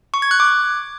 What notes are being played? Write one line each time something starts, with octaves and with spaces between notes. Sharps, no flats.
C#6
G#6
F#6
D6